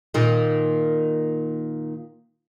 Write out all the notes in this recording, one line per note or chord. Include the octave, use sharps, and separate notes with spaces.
A#2 D#3